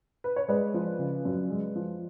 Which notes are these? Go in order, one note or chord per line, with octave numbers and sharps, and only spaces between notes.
B4
C#5
G#3 B4 D5
F3
C#3
F#2
G#3
F3